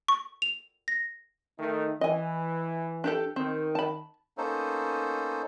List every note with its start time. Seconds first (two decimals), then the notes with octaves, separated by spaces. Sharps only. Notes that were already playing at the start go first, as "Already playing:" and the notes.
0.08 C#6
0.42 F7
0.88 A#6
1.59 D#3 A3 D#4
2.01 E3 D#5 G#5
3.04 D4 G4 A4
3.36 D#3 C4
3.75 A5 B5
4.38 A#3 B3 C#4 D#4 A4 C5